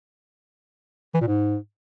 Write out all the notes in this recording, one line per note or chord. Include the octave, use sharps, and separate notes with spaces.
E3
A#2
G#2